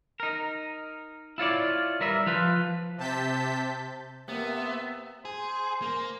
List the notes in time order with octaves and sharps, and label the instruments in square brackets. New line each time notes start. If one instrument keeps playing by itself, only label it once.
[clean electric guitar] D#4 A#4
E4 F4 C#5 D5
G3 A#4 B4 E5
F3 F4 B4
[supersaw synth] C3 A5 G6 B6
[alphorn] C3 [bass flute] A#3 [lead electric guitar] B3 [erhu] E5
[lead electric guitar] G#4 [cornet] C5
[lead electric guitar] A#3